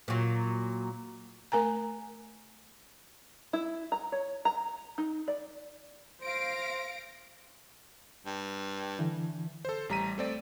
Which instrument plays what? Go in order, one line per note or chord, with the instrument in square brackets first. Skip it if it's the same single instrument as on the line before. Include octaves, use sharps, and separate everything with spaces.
[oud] A#2 F#3
[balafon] A3 A#4 G#5 A#5
[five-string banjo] E4
A#5
C#5
A#5
D#4
D5
[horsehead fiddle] C5 [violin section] F5 A#6 D7
[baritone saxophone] G2
[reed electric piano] D3 E3
[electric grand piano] A4 C5
A1 G3 A#5 B6 D#7
A3 C4 D5